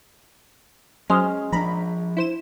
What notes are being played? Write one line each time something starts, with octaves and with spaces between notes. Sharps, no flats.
F#3 G#3 C#4 C5 F6
F3 C4 D4 A#5 B5
E4 C5 E7